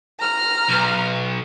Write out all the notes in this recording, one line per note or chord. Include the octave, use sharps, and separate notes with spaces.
A#5 F6
B1